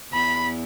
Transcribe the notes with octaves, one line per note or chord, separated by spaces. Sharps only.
E2 B5